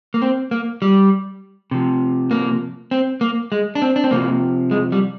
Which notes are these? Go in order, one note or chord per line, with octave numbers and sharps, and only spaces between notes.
A#3
C4
A#3
G3
C3 F3
A#3
C4
A#3
G#3
D4
C4
D4
C4
C3 F3 A#3
G#3
G3